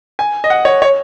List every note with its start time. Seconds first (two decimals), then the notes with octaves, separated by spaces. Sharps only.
0.19 G#5
0.44 D#5
0.50 F#5
0.65 C#5
0.82 C#5